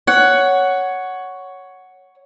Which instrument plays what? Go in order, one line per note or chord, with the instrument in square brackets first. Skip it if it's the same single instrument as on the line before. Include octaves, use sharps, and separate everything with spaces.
[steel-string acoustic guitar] C#5 F#5